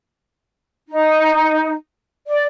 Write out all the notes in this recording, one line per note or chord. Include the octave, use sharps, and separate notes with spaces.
D#4
D5